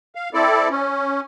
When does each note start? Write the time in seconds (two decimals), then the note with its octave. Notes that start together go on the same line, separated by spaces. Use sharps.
0.15 F5
0.34 C4 E4 A4 D5
0.70 C#4